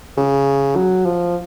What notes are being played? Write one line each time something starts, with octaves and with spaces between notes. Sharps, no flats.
C#3
F#3
F3